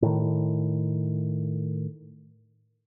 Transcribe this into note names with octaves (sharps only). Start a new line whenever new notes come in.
A2 D#3